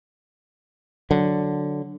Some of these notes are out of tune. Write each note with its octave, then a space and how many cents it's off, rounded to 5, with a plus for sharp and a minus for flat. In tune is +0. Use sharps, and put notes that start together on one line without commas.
D3 +0 F#3 +0